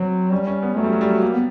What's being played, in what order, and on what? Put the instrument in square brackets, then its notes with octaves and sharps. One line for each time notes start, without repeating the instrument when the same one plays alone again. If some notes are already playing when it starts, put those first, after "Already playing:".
Already playing: [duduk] F#3 [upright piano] C4
[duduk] G3 [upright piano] C#4
[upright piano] C#4
B3
[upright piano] F#3 [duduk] A3
[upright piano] G3
F#3
G3
F#3
[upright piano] G3 [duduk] A#3
[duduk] B3